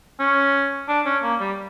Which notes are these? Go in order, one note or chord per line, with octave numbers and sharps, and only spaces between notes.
C#4
D4
C#4
A#3
G3